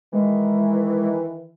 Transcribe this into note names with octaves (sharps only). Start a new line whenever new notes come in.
D#3 E3 G#3